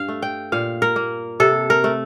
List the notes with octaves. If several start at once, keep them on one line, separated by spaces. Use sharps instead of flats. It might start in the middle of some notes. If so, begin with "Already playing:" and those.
Already playing: G2 F5
A3
G5
A#2 F5
A#4
A#3
C3 A4
A#4
A3